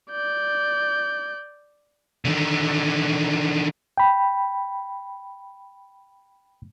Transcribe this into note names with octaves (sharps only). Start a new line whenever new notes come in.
D5 G6
D3 D#3
G5 B5